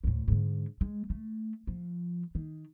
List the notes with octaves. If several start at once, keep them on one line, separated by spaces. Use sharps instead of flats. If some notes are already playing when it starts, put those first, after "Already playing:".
D2 A2
G#2 D3
G#3
A3
F3
D#3